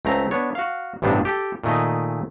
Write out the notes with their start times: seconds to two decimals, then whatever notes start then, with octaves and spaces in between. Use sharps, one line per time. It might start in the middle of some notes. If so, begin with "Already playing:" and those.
0.05 C#2 A3 C4 A#5
0.31 B3 D4 C#5
0.55 F#4 F5
1.02 A1 G2 C3 B3 C4 D4
1.25 G4 A4 G5
1.64 A#2 D#3 A3 G#4 D#5